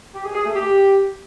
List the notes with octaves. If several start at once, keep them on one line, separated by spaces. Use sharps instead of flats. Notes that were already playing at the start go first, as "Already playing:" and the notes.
G4
G#4
G#4
A3
G4